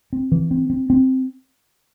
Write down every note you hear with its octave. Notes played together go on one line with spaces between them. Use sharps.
C4
E3
C4
C4
C4